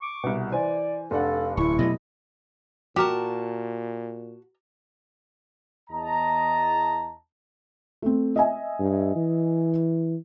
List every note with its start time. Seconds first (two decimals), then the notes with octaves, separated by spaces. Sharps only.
0.01 C#6 D6
0.24 C2 B2
0.52 E3 C5 D5 G#5
1.11 F1 D4 A4 F5 F#5
1.57 D1 E4 C#6
1.79 B2 F#3 A3 G4 D#5
2.96 A#2 F#4 G4 A#4 A5
5.90 E2 D#5 A5 A#5
8.02 A3 C4
8.36 D#5 E5 G#5
8.79 G2
9.16 E3